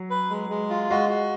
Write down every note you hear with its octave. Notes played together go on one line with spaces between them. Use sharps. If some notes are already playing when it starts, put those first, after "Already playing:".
Already playing: F#3
B4
G#3
G#3
F4
G#3 F#4
F#4